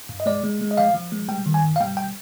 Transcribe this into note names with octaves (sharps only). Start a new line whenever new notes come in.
G2
D#5
G#3 D5
G#3
G#3
D#5
F3 F5
F3
G#3
G3 G5
D#3
G#5
G2
F5
G3 G5
G5